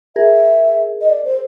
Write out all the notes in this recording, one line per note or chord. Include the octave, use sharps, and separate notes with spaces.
G#4 A#4 E5
D#5
D5
C5